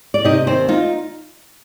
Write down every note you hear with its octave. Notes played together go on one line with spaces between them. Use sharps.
D5
C3 D#4 D#5
D#3 C4 C5
D#4 F4